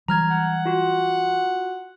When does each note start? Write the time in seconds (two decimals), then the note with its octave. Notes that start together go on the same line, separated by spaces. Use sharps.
0.08 E3 F#3 G3 A#5 F6 G#6
0.30 F#5
0.65 F4 F#4